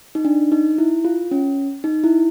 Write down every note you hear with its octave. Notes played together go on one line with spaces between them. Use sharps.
D#4
D4
D#4
E4
F4
C#4
D#4
E4